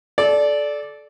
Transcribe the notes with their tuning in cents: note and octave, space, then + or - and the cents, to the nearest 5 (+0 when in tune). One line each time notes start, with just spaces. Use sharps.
A4 -25 D5 -5